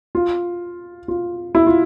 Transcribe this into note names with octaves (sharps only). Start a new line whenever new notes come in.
F4
F4
E4
F4